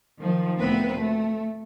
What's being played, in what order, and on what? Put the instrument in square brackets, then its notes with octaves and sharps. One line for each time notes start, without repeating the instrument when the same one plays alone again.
[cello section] D#3 F3
D2 A#2 B3 C4 B4
A3